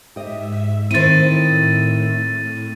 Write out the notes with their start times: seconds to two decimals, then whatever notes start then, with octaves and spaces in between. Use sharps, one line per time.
0.16 G#2 G4 D#5 E5
0.91 A2 D#3 C4 E4 C5 A6 D#7